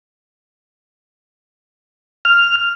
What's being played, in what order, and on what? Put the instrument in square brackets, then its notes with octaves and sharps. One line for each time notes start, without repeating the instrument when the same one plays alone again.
[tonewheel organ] F6